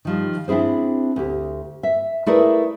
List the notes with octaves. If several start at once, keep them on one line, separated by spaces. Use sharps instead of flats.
D#3 F3 G3
C4 D4 E4 G#4 C5
D2 G4
E5
A3 E4 G#4 A#4 B4 D5